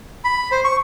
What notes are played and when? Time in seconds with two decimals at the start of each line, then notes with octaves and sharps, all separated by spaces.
0.24 B5
0.52 C5
0.64 C#6